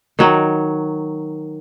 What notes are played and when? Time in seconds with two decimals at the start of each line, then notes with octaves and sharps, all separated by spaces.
0.19 D#3 F#3